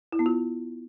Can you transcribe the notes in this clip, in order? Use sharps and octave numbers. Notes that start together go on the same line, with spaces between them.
E4
B3
F4